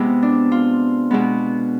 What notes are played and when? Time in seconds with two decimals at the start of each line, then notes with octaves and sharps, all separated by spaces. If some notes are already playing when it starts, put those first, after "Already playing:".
Already playing: C3 G#3 B3 E4
0.23 D4
0.52 F4
1.11 B2 G#3 B3